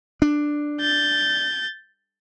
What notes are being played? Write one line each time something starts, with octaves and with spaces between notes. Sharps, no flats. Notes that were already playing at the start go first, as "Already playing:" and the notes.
D4
G6 A6